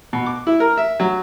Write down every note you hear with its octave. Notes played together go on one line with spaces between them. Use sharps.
B2
D6
E4
A#4
E5
F#3